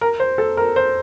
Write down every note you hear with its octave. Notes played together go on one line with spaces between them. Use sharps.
A#4
C5
A4
A#4
C5